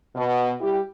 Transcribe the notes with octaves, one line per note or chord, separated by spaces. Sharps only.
B2
G3 E4 G4